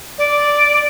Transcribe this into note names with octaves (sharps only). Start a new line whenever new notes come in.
D5